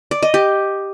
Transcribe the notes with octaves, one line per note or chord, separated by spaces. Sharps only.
D5
D#5
G4